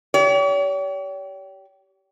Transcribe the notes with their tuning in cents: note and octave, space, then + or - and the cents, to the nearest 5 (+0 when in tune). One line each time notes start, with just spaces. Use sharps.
G4 -20 C#5 +45